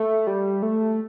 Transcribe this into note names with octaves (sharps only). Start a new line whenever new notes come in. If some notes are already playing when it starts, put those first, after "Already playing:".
Already playing: A3
G3
A3